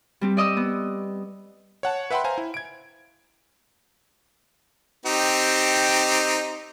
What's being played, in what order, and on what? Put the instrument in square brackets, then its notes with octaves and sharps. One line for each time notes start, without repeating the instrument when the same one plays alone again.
[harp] G3 C4 G4
D5 D#5 D#6 E6
B3
[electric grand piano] C#5 F#5 A5
B4 E5 F#5 G5 B5 C6
C5 F5 G#5 A#5
E4
G#6 D7
[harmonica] C4 D#4 G4